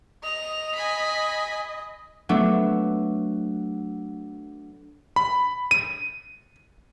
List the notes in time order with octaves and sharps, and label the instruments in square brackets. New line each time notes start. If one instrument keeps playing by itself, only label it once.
[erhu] D#5 [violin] F7
[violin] G#5 B5
[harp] F#3 A3 B3 D4 A4
[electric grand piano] B5
D#7